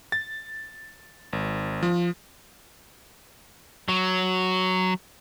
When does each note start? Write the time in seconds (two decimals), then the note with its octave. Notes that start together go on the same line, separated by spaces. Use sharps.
0.12 A6
1.33 G#1
1.83 F3
3.89 F#3